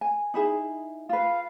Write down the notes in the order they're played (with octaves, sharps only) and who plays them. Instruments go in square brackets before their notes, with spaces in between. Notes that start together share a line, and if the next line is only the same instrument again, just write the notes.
[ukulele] G#5
D#4 E4 G#4
[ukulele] F4 B4 [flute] F5